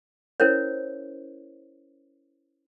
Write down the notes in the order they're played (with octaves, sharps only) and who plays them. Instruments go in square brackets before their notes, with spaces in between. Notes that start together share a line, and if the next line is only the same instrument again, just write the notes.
[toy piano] C#4 E4 A#4 C5 C#5